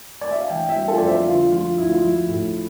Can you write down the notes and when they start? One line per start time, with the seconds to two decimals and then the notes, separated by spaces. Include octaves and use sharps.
0.21 D5
0.31 E5
0.40 F5
0.50 E3 E5 G5
0.69 E5 G5
0.76 G3
0.88 F4 A4
0.98 F2 D5
1.07 C5 E5
1.27 D3 F4
1.52 F3 F4
1.78 D2 E4
1.90 F4
2.01 F3 E4
2.29 A2